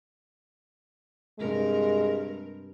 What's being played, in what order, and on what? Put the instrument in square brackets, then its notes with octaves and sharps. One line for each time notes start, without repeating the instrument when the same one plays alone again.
[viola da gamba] G2 C3 A#4 [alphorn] G#3